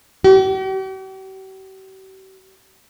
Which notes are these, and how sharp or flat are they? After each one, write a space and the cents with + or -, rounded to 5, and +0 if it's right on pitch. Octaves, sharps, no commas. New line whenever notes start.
G4 -45